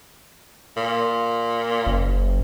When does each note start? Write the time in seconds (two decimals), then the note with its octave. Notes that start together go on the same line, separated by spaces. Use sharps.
0.77 A#2
1.87 F#1